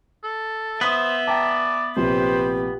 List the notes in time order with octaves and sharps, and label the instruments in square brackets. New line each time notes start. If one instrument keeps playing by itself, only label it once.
[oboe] A4
[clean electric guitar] B3 [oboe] C5 [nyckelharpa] E5 [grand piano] D#6 B6
[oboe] D5 [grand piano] G5 A5 A#5
[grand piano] A#1 C3 [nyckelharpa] G4 B4 [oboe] C5